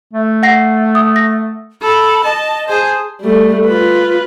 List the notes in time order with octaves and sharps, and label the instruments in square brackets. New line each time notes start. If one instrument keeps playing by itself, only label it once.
[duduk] A3
[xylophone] F#5 A#6 C7
D#6
A#6
[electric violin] A4 [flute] B5
[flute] D#5 [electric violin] A5
[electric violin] G#4 C5 [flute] A5
[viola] G3 A3
F4 B4